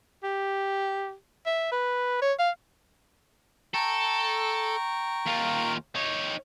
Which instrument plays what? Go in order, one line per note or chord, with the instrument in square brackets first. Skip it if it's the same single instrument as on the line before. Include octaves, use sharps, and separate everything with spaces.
[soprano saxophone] G4
E5
B4
C#5
F5
[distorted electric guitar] A4 [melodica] G5 A#5 C#6
[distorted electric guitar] D#2 F4
D#4 C#5